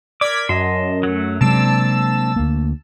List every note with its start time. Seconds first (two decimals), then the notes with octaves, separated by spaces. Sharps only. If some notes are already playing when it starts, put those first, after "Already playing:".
0.21 A#4 D5 D6 G#6 B6
0.49 F#2 D#5 A5 C6
1.03 F#3 A3
1.41 C3 F#3 G#3 A#3 C4 D4 A5 E6
2.36 D2 A#3